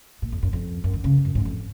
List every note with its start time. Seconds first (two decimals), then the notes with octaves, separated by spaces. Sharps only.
0.22 A#2
0.32 F2
0.43 F#2
0.53 F2
0.84 F#2
0.93 D#3
1.04 C#3
1.25 F#2
1.35 G#2
1.45 F2